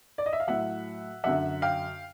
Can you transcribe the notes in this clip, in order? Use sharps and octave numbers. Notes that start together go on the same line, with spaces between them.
D5
D#5
E5
F5
A2 F#3 E5 F#5
F#2 D3 F#3 E5 F#5
F5 G5